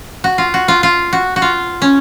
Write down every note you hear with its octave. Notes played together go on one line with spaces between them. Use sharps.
F#4
F4
F#4
F4
F4
F#4
F#4
F4
C#4